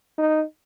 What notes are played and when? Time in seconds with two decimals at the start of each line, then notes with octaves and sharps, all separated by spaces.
0.18 D#4